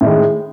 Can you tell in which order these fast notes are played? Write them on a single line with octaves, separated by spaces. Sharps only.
A2 D#3 G#3